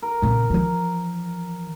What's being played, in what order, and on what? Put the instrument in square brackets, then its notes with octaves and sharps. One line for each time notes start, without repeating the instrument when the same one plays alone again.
[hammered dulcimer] A#4
[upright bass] A#2 C#3
E3 F3